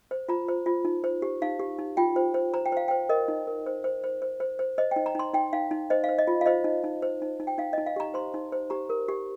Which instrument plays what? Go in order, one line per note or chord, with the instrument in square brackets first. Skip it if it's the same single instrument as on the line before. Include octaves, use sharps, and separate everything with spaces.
[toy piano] C5
F4 A#5
C5
F4
D#4
C5
G4
D#4 F5
G4
D#4
F4 G5
C5
C5
C5 A#5
G5
C5 F5
C5 G5
A#4 D#5
D#4
A#4
C5
C5
C5
C5
C5
C5
C5 D#5
G5
D#4
A#5
D#4 C6
D#4 G5
D#4 F5
D#4
C5 D#5
F5
C5
D#5
F4
F5
C5 D#5
D#4
D#4
C5
D#4
D#4
G5
D#4 F5
D#4 D#5
F5
G4 A#5
C5 C6
D#4
C5
G4 A#5
A#4
G4